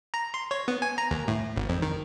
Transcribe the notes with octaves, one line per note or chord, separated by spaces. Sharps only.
A#5
C6
C#5
B3
G#5
A#5
D#2
A2
G#1
F2
D#3